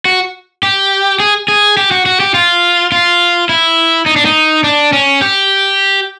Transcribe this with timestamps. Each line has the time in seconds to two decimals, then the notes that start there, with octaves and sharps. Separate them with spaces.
0.05 F#4
0.63 G4
1.20 G#4
1.48 G#4
1.77 G4
1.91 F#4
2.06 F#4
2.20 G4
2.34 F4
2.92 F4
3.49 E4
4.06 D#4
4.16 D4
4.25 D#4
4.64 D4
4.93 C#4
5.22 G4